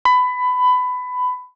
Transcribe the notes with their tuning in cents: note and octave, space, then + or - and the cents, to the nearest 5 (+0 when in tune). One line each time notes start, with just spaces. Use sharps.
B5 +20